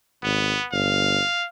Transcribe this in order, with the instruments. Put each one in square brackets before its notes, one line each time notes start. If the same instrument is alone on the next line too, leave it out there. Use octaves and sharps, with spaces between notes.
[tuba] G#1 [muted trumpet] B3
[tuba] G1 [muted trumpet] F5